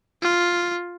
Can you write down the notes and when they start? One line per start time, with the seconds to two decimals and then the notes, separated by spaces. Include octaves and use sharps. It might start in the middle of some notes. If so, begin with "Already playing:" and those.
0.22 F4